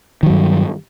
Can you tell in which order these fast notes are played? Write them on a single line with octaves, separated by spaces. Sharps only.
D#3 F#3 G2